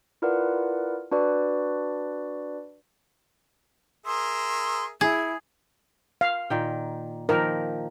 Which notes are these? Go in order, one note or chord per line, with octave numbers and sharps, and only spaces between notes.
E4 F4 A#4 B4 D5 F#5
D4 F#4 B4 D5
G#4 A#4 E5 C6
E4 G#4
F5
A#2 D#3 G5
D#3 F3 A#3 A#4